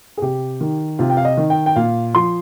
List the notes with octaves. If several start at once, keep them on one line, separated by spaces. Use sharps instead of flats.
G#4
C3 G4
D#3
C3 F4
G5
F5
D#5
D#3
G5
G5
A#2 F5
F3 C6